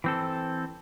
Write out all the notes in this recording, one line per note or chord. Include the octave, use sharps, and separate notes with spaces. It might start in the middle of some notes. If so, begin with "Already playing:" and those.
E3 C4 A4